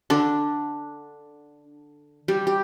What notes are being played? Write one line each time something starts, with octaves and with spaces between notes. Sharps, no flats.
D3 D4
G3 G4
G4